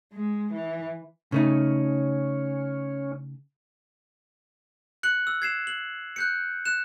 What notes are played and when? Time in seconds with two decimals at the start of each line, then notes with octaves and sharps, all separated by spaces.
0.13 G#3
0.53 E3
1.32 C#3 A3 C#4 D#4
5.03 F#6 C#7 F#7
5.27 E6
5.42 G#6 C7 E7
5.67 F#7
6.16 F#6 G6 C#7
6.66 F#6 E7